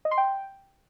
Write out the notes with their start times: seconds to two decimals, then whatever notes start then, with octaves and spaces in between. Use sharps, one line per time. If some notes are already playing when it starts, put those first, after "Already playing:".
0.05 D#5
0.11 C6
0.18 G5